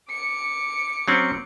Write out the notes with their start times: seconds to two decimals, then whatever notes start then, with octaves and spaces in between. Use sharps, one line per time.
0.10 D6 C#7
1.08 F#3 C4 C#4